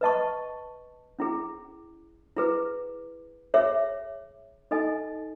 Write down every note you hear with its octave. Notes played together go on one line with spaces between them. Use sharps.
B4 D#5 A5 C#6
C#4 E4 G#4
E4 G#4 B4
G#4 C#5 E5
D#4 A4 D#5 G#5